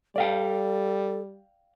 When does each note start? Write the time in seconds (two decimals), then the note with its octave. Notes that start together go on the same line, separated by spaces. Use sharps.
0.16 G3 A4 D5 F5 G5